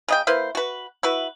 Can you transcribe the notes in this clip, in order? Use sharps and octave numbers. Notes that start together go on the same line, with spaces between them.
C#3 D#5 G5
A#3 E4 B4 C5
F#4 B4
E4 F#4 B4